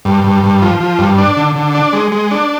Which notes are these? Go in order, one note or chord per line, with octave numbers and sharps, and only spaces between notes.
G2
G2
G2
F3
F3
G2
D4
D3
D3
D4
G#3
G#3
D4